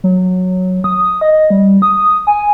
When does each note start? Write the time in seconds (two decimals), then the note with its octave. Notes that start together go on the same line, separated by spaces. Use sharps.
0.04 F#3
0.84 D#6
1.21 D#5
1.50 G3
1.82 D#6
2.27 G#5